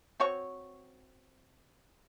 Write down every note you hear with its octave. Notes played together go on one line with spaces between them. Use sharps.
C4 F#4 C#5 C#6